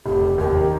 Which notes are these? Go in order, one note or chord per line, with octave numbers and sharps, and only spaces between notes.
F1 G4
F1
D#2 G4
D#3